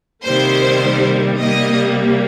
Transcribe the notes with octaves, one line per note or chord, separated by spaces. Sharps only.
C3 D#3 G3 A#3 C5
C3 G3 A#3 D#5